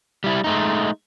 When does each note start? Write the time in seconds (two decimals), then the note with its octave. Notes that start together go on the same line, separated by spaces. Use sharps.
0.24 G3 E4
0.44 G#3 A3 D#4